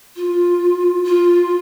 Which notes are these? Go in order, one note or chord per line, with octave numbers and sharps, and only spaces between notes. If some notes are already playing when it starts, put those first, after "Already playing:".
F4
F4